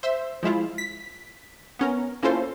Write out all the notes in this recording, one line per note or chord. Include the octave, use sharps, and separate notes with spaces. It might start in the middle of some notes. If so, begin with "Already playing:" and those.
C5 E5
F3 G#3 E4 F4
B6
B3 C#4 A#4
A#3 C#4 E4 F4 A4 C5